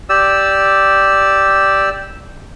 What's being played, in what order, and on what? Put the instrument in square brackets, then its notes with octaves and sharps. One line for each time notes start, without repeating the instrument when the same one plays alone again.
[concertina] G4 D5 E6